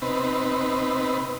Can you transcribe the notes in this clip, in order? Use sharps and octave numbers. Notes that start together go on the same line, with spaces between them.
C3 B3 C4 D#4 B4